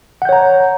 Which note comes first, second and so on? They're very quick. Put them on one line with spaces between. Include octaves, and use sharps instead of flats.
F#5 G6 C#5 A#5